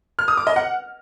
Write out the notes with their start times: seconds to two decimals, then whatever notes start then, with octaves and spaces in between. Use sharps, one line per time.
0.19 F6
0.28 D#6
0.37 D6
0.47 D#5
0.56 F#5